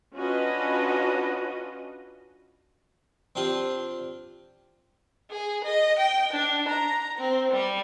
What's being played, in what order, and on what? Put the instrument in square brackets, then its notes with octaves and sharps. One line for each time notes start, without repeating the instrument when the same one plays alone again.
[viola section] C#4 D4 F4 F#4 B4 D#5
[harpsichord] C4 D4 F4 G4
[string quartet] G#4
D#5
G5
D4
A#5
C4
G3